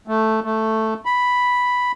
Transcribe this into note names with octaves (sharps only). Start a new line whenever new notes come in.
A3
A3
B5